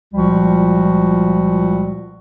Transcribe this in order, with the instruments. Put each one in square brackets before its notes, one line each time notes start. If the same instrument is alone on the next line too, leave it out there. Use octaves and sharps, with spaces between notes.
[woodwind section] C#2 A#2 F3 G3 F#4